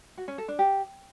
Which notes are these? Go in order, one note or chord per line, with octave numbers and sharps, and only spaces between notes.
F#4
C#4
A4
D4
G4